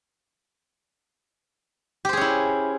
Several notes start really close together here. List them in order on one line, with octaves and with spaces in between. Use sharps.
G4 C5 G#4 C#4 E4